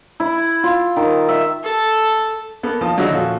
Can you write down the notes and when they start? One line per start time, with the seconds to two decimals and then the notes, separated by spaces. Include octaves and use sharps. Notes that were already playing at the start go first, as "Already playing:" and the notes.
0.20 E4
0.63 F4
0.96 D#3
1.29 E5
1.64 A4
2.63 A#3 B3 A4
2.81 B1 F3 A5 D#6
2.97 D3 F#3 G#3 D#4 E4 F#4
3.12 A#2 F3 C#4 F#4 A4